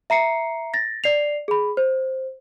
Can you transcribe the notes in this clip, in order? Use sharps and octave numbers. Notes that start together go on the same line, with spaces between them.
E5 A#5 C7 C#7
A6 A#6
D5 C7 F7
G#4 B5
C5